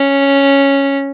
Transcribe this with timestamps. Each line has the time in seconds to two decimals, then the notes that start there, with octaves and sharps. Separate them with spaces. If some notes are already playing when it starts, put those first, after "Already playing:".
Already playing: C#4